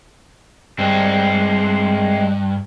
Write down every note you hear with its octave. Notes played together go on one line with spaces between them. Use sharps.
G2 G#3 C4